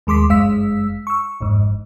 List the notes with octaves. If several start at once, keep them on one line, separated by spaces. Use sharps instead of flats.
D#2 G#3 C6 D6 B6
G1 F#2 G#3 F5 E6 B6
C#6 E6
G1 F2 G#2